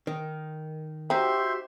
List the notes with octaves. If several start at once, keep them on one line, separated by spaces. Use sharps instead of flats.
D#3
C4 D#4 F#4 G4 E5 C6 G6